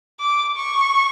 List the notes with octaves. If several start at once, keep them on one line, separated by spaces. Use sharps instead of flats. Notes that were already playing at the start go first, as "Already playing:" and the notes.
D6
C#6